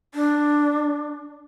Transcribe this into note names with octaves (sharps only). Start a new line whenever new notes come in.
D4